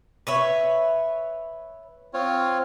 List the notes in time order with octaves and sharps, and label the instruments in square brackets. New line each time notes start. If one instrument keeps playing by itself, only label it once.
[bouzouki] B4 C#5 E5
[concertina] C4 F4 C#5